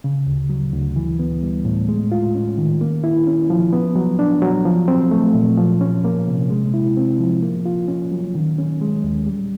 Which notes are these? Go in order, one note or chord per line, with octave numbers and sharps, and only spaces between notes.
C#3
D2
F#3
D2
E3
B3
G3
A2
G#3
F4
C#4
D#3
A#3
E4
C#4
F3
B3
F#3
D4
F#3
F3
C4
A3
A#2
F3
C#4
A#3
C3
G#3
E4
C4
F3
A#3
F4
C#4
F#3
D#3
C#4
G#3
D#2
G3